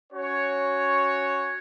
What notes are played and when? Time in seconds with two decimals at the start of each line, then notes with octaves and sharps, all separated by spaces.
0.12 C#4 F#4 C#5